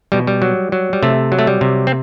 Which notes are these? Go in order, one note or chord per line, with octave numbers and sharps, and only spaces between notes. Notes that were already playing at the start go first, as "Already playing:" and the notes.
B2 G3
G3
F#3
F#3
G3
C3 A3
F#3
A3
G3
C3
C4